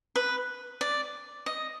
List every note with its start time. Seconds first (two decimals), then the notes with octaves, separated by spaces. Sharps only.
0.16 B4
0.81 D5
1.46 D#5